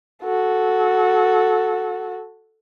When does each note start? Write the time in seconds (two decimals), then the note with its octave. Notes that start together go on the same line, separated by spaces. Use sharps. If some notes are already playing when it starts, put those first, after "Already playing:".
0.24 F#4 A4